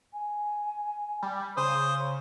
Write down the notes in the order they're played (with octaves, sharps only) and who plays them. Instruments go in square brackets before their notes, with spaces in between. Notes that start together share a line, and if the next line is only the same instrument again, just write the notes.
[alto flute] G#5
[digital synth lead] G3
[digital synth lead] C#3 [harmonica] C5 D#6 [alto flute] C#5